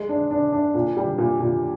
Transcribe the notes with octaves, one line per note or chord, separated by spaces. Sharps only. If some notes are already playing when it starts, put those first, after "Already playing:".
Already playing: G#3
D4
D4
D4
A#2
G3
A#2
A#2